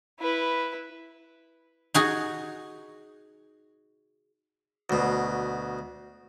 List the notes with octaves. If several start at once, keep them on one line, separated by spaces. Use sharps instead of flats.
E4 B4
D#4 F#4 G#4
D2 B2